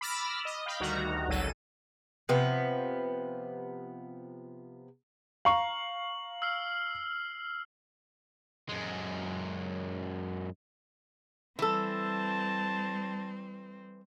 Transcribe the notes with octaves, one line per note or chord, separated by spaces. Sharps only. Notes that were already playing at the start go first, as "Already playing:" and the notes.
B5 D6 E6 F6 A6 A#6
D#5
F5 G5 B5
D2 D#3 G3 F#4 A#5
G#1 C#2 F#3 A4 D#7 E7
C3 F3 B3
F5 A#5 C#6 F#7
E6 F6 C7
F#2 G#3
E3 G3 C4 A4 A5